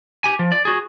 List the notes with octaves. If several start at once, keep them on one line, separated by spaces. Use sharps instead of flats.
G4 G#5
F3
D5
F#4 G#4